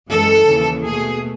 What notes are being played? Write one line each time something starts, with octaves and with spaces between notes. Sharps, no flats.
F#2 E3 G#3 A4
D#2 C#3 E3
B2 A3 G#4